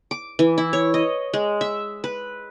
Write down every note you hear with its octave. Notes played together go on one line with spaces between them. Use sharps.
D6
E3
E4
C#5
D#5
G#3
E5
B4